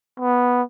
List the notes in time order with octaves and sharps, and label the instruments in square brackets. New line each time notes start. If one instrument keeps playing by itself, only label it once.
[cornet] B3